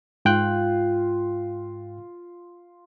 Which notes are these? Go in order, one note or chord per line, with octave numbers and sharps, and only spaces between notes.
G#2 F4 G5 F#6